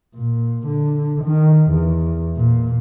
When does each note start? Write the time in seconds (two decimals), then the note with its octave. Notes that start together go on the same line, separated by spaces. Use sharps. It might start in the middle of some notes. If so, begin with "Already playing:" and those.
0.15 A#2
0.66 D3
1.24 D#3
1.70 E2
2.37 A#2